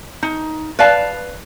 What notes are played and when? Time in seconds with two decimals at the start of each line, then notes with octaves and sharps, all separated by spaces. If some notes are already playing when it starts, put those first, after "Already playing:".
0.23 D#4
0.79 B4 D5 F5 A5